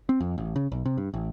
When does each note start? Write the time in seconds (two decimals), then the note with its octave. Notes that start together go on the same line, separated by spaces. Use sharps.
0.09 C4
0.20 F2
0.38 A1
0.56 C#3
0.72 B1
0.86 C3
0.98 G2
1.14 A1